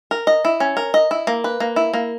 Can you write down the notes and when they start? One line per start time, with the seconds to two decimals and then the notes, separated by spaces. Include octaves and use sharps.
0.11 A#4
0.27 D#5
0.45 E4
0.60 C#4
0.77 A#4
0.94 D#5
1.11 E4
1.27 A#3
1.44 B4
1.60 A#3
1.76 E4
1.94 A#3